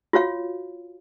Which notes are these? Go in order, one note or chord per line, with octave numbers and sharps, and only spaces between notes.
F4 F#4 C#5 F5